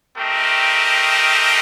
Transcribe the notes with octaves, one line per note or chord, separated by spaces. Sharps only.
A3 C4 G4 A#4 D#5